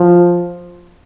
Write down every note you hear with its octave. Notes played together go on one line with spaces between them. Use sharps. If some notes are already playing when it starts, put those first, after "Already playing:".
Already playing: F3